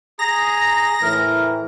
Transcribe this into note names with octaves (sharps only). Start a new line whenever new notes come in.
G#4 A#5 A#6
A2 E3 A#4